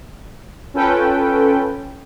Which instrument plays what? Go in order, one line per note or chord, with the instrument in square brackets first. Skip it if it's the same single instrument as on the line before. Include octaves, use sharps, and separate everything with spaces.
[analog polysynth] C#4 F4 A4 B4 G5